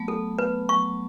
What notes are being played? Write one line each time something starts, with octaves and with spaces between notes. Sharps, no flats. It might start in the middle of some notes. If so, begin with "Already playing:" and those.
Already playing: F#3 A3 B3
A4
B3 B4
F#3 C#6